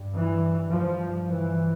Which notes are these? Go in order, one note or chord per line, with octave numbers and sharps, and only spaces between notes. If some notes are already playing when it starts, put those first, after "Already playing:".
Already playing: G2
E3
G2 F3
E3